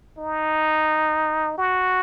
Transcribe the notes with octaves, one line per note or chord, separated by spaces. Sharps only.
D#4
F#4